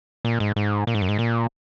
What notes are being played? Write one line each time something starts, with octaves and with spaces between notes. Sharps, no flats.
A#2
G#2
G#2
A#2
G#2
F#2
G#2
A#2